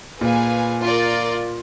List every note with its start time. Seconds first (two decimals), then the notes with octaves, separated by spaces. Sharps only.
0.21 A#2 G#4 B4 F5 G#5
0.84 F4 A#4 D5